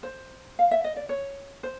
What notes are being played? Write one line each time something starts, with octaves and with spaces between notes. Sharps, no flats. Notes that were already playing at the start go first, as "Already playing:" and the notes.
C5
F5
E5
D#5
D5
C#5
C5